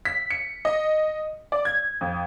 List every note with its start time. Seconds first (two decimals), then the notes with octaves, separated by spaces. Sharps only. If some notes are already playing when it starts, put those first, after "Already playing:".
0.05 B6
0.30 C#7
0.65 D#5
1.52 D5
1.65 G#6
2.01 F2